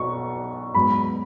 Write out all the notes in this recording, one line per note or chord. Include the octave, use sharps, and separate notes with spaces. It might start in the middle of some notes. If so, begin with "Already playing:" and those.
Already playing: B1 C#6
G#2 F#3 B3 B5